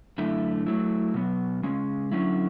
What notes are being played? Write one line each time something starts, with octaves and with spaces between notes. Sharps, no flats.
F#2 D3 A3 E4
F#3 A3 E4
B2 F#3 B3
C#3 G#3 C#4
D3 F#3 C#4 E4